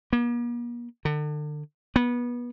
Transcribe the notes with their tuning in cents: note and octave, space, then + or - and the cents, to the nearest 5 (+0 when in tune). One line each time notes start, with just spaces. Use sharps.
A#3 +45
D3 +35
B3 -25